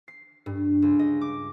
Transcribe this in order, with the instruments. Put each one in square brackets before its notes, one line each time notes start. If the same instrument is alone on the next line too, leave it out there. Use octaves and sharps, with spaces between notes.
[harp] C7
G2
C#2
D#5
D6